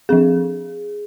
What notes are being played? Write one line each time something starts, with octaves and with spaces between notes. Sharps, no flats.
F3 C4 G#4